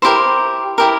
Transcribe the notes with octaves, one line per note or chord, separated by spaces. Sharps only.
E4 G4 A#4 C5 C6
E4 G4 A#4